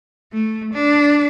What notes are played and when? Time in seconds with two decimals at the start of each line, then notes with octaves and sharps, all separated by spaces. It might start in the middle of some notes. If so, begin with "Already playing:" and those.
0.33 A3
0.74 D4